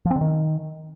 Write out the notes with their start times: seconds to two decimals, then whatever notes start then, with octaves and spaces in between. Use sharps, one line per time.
0.05 F3
0.11 C4
0.16 D3
0.21 D#3